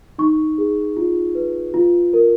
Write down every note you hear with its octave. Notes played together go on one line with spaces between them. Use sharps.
D#4 C#6
G#4
F4
B4
F4
A#4